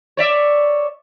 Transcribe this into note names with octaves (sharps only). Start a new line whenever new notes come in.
C#5 D5 E5